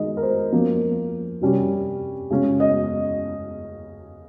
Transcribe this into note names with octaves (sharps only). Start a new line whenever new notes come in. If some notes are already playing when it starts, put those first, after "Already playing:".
Already playing: D#3 G#3 D#4 D#5
A#4
C5
F3 A#3 C#4
C3 G3 C#4
C#3 G#3 C#4
D#5